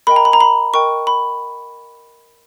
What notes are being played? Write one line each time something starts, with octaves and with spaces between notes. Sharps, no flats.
A#4 D#5 G5 B5
A#5
B5
A#5
B5
A#4 D#5 G5 C#6
B5